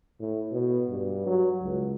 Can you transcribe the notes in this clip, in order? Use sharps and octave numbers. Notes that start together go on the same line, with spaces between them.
A2
B2
G2
F#3
C#2